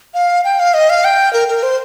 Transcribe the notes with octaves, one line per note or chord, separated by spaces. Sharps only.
F5
G5
F5
D#5
F5
G5
A#4
A#4
C5